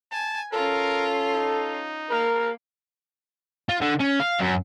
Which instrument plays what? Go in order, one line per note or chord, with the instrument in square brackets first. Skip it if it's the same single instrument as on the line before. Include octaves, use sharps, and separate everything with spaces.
[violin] G#5 [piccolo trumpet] A5
[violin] C#4 F4 [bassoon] A4 [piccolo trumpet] A#4
[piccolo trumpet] D#4
[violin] A#3 [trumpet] A#4
[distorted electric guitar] F4
D3
C#4
F5
F#2